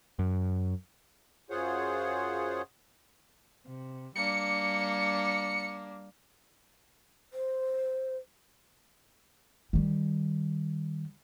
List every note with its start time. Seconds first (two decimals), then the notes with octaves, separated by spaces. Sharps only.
0.19 F#2
1.50 F#2 F4 G#4 C5 C#5 F#5
3.66 C3
4.16 G3 A#3 D4 C#7
7.31 C5
9.73 D#3 G3